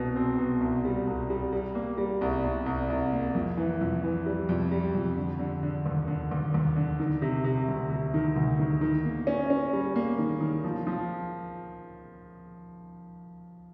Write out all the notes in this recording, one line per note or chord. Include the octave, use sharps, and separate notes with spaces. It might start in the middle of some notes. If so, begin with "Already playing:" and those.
Already playing: C2 B2
C4
B2
C2
G3
C2
G3
G3
A#3
G3
C2
C2
C2
C2
A#3
F2
E3
F2
E3
G3
F2
G3
F2
D3
D3
D3
D#2
D3
D#2
D#2
D3
D#3
C3
C3
D2
C3
D#3
D2
D#3
D#3
A#3
C#4
C#4
G3
A#3
D#3
D#3
F3
F3